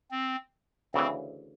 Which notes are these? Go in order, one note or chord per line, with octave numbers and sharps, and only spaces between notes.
C4
D2 C#3 E3 C4